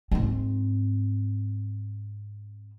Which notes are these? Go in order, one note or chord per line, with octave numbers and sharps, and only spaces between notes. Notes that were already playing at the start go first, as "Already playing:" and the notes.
G#2 C4